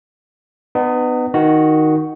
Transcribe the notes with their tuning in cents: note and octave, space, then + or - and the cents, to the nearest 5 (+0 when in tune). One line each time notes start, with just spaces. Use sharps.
B3 +15 D#4 -40
D#3 +0 F#4 +0